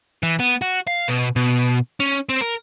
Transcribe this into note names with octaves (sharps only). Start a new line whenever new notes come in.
E3
B3
F#4
F5
B2
B2
C#4
C4
A#4